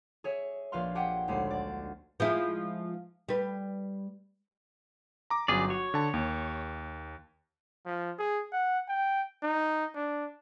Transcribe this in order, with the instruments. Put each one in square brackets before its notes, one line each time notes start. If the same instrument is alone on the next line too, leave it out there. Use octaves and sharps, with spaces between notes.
[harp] G#4 C#5 E5
A#1 F4 B4 F5 C6
G4 G#4 F#5 G5
D#1 D2 G#3 C7
D5
[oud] F3 G#3 E4
G3 B4
[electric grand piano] A#5 D6
[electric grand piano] G1 F#3 [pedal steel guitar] C#4 G#4 D5
[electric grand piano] F#4 [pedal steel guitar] C#5
[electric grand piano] D3 A5
D#2
[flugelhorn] F3
G#4
F#5
G5
D#4
D4